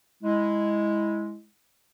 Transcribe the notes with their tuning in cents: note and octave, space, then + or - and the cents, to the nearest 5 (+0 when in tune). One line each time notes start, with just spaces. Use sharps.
G#3 +0 E4 -10